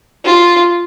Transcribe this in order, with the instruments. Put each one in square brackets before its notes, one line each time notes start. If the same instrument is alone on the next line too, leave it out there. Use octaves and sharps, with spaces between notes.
[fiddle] F4